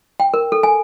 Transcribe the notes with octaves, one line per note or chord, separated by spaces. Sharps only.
G5
A#4
A4
G#5